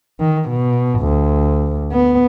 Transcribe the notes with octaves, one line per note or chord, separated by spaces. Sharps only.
D#3
B2
D2
B3